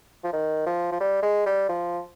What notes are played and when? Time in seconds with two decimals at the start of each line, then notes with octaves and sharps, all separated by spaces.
0.24 F3
0.33 D#3
0.66 F3
0.92 F3
1.01 G3
1.23 G#3
1.46 G3
1.69 F3